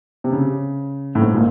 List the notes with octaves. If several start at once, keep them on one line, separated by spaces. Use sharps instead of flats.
C3
C#3
A2
G#2
A#2